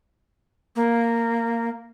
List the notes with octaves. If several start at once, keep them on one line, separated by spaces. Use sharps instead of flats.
A#3